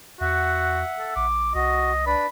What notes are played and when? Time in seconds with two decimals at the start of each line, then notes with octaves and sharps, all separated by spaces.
0.21 E2 F#4 E5 F#5
0.99 A4
1.16 A#1 D6
1.55 C2 F#4 D#5
2.06 D4 B4 D5 B5